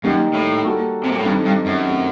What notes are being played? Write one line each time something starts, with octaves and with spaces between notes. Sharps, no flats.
F#2 D#3 G3 A#3 D#4 G4
A2
G3 A#3 F#4 A4
C3
A#2
A2
G2 D#3 G3 C4 D#4 A4
G2
F#2
D#3 A3 C4 G4